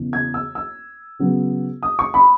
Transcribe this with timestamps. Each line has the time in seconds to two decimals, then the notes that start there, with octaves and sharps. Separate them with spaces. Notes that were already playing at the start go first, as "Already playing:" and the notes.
Already playing: E2 C#3 E3
0.13 G#6
0.34 E6
0.55 E6
1.19 C#3 F#3 B3
1.83 D#6
1.99 C#6
2.14 B5